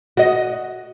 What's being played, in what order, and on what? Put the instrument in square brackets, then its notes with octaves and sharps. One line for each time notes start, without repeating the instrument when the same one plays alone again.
[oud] F#4 D#5